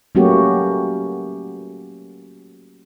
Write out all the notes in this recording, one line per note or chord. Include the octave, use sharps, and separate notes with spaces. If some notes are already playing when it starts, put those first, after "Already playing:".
F#3 A3 A#3 C#4 F#4 G4